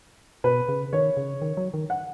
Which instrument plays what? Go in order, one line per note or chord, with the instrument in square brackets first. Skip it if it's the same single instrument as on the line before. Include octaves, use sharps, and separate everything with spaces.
[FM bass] B2 [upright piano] B4
[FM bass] C#3
[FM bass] D#3 [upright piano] C#5
[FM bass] C#3
D#3
F#3
D#3
[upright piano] F#5